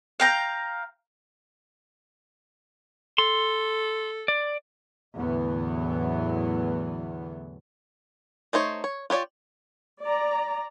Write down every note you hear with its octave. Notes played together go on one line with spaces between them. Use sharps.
F5 G5 A#5
A4 C6
D5
E2 A2 D3 E3 F#3 B3
A3 D#4 C5 C#5
C#5
F4 G4 C#5 D5
D5 A#5